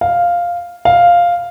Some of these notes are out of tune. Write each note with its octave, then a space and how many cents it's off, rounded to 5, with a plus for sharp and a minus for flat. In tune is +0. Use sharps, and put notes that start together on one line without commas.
F5 +0
F5 +0